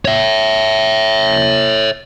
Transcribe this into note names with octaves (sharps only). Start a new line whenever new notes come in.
C#5 E5